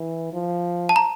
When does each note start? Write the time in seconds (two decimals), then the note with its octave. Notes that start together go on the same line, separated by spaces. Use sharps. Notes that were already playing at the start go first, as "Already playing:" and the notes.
Already playing: E3
0.33 F3
0.89 A5
0.96 A#5